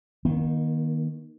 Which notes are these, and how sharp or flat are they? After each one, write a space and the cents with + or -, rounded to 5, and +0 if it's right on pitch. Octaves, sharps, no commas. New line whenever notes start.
D#3 +0 A#3 +40